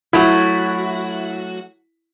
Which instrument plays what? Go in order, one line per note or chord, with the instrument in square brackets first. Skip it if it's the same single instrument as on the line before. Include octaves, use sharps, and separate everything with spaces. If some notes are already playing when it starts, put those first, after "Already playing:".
[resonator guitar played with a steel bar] F#3 A3 F#4 [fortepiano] E4